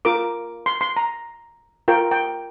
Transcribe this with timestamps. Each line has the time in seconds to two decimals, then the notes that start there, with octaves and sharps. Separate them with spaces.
0.05 F4 A#4 D6
0.66 C6
0.81 C6
0.96 A#5
1.88 F4 A#4 G5
2.11 G5